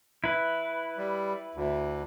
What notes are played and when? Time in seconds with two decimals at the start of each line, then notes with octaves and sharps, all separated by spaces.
0.24 E4 B4
0.97 G3
1.55 D2